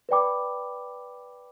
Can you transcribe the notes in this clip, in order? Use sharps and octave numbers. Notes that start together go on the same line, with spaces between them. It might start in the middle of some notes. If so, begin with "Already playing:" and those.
B4 D5 G5 B5 D6